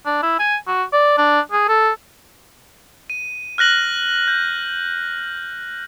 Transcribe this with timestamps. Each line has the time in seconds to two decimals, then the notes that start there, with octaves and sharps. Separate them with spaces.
0.05 D4
0.23 E4
0.39 G#5
0.67 F#4
0.93 D5
1.18 D4
1.52 G#4
1.68 A4
3.10 D#7
3.58 F6 F#6 A#6 F#7
4.28 G6